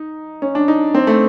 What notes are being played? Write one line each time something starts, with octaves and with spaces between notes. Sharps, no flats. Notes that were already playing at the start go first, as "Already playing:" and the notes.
Already playing: D#4
C#4
D4
D#4
C4
A3